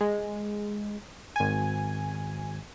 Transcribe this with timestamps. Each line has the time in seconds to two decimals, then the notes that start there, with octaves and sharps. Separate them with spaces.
0.01 G#3
1.36 G#1 G#5